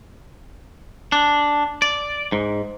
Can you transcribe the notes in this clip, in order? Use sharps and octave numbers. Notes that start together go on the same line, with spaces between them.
D4
D5
G#2